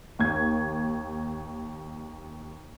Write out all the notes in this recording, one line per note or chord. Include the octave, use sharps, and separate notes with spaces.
D#2 G#6